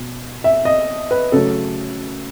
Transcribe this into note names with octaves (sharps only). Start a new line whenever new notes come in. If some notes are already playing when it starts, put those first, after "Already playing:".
Already playing: B2
E5
D#5
B4
C#3 F#3 A3 A4